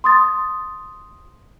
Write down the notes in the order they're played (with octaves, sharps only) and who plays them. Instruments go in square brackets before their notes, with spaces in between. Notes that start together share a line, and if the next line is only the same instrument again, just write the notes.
[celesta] C6 D#6 A6